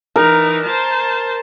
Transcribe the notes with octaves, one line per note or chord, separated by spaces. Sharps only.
E3 D#4 A#4
C5 A5